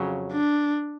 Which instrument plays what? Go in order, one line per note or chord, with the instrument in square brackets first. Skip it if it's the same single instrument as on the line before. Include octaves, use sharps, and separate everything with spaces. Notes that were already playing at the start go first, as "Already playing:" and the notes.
Already playing: [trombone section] F2 C#3 F#3
[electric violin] D4